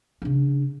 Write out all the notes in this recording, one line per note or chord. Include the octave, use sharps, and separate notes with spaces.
C#3 D4